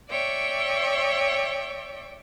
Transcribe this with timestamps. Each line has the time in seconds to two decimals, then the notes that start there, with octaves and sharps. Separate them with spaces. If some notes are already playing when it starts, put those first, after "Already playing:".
0.11 C#5 D5 E5 G5 C#6